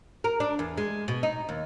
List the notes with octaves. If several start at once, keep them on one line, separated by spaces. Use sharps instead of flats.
A#4
D4
E2
G#3
B2
D#4
D#2